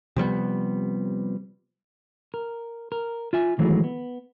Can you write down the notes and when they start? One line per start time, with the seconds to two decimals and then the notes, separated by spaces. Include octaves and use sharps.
0.16 C3 F3 G3 B3
2.34 A#4
2.92 A#4
3.33 F4 E5 G#5
3.59 D#3 E3 F#3 G#3 A3
3.84 B3